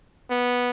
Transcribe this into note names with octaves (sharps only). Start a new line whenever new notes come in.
B3